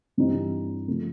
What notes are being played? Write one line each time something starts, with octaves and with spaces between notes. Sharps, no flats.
G2 E3 G3 C4 D#4
C#3 F3 A3